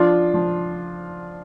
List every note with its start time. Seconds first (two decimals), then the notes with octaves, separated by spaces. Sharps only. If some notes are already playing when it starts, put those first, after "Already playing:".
Already playing: F3 D4 F4
0.34 F3